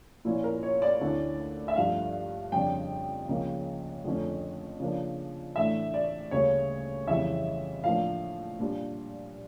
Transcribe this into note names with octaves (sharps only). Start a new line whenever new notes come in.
A#2 F3 C#4 E4
A#4
C#5
D5
D2 D3 A3 C#4 E4
E5
G2 F3 A3 D4 F5
F2 C#3 G3 D4 G5
C#2 C#3 F3 A#3
F2 D3 F3 A3 C#4
C#3 F3 A#3 D4
A2 E3 A3 D4 E5
D5
D2 C#3 G3 A#3 C#5
F2 C#3 E3 G3 E5
A2 F3 A#3 D4 F5
A#2 G3 D4